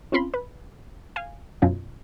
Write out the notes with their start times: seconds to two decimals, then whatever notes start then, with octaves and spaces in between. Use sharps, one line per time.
0.12 C4 C#4 F4 B5 C6
0.34 B4
1.16 F5 G#5
1.62 F#2 B2 F#3 C#4 F4